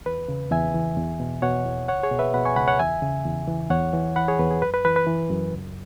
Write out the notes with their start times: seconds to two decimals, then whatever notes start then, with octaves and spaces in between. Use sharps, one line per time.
0.06 E2 B4
0.28 C#3
0.51 E2 E5 G#5
0.74 E3
0.97 E2
1.20 B2
1.42 B2 C#5 F#5
1.65 E2
1.88 C#2 C#5 F#5
2.03 G#4 C#5
2.11 B2
2.19 B4 E5
2.34 B2 F#5 B5
2.45 G#5 C#6
2.56 C#2 F#5 B5
2.68 C#5 F#5
2.79 E2 E5 G#5
3.02 C#3
3.25 E2
3.48 E3
3.70 E2 C#5 F#5
3.93 E3
4.16 E3 F#5 B5
4.28 G#4 C#5
4.39 E2 B4
4.50 G#4
4.62 F#2 B4
4.74 B4
4.85 E3 B4
4.96 B4
5.07 E3
5.30 F#2
5.53 C#2